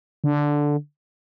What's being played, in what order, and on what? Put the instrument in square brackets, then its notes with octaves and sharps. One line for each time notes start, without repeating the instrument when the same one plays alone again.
[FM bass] D3